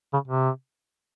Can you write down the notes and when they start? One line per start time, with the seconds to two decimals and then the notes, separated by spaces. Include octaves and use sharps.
0.13 C#3
0.28 C3